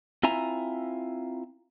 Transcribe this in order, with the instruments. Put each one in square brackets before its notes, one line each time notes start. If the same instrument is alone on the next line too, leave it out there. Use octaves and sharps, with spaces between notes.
[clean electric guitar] C4 E4 F4 E5 G#5 A#5